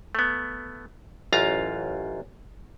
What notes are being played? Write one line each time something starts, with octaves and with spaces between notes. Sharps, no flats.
A3 B3
A1 F#2 F4 F5 A#5